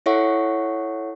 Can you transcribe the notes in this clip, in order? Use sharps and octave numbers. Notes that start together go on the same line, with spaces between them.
E4 A4 C#5 E5 F#5 C#6